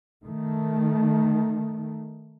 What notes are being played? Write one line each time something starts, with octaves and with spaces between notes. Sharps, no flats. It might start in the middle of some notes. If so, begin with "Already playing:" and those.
D#3 A3